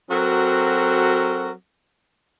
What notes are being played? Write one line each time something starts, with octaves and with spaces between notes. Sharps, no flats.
F#3 C4 F#4 A4 A#4